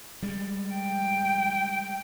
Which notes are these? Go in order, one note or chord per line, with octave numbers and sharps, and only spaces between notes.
G3 G#3
G5